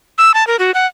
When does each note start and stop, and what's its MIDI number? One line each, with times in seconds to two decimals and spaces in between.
0.18 0.32 88
0.34 0.46 81
0.47 0.56 70
0.59 0.71 66
0.74 0.86 78